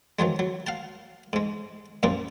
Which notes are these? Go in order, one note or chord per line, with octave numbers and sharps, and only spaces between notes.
D#3 F3 F#3 G#3
F#3
F5 F#5 A5
G#2 G#3
F#2 A#2 F3 G3 A#3